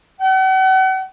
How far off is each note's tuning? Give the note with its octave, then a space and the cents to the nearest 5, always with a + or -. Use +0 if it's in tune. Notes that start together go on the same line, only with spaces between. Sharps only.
F#5 +40